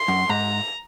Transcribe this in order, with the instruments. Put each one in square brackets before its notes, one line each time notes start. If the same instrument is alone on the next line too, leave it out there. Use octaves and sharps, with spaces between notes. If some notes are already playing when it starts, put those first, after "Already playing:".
Already playing: [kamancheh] C6
[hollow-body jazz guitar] F#2
[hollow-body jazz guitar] G#2 [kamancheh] A#5